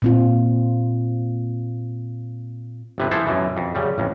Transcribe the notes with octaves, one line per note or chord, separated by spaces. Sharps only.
A#2 C4 F4
G1 C3 B4
E3 F3 E4 A4 C5
F#2 B2 E3
F2
F#2 C#3 G3
A1 F2